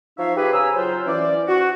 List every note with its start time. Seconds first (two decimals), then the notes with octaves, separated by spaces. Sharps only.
0.18 F3 D#4 C5 C#5 E5 F5
0.37 G4 G#4 B4
0.53 C#3 G#5 A#5 E6
0.75 F#3 F4 C5
1.06 E3 C#4 C5 D5
1.48 F#4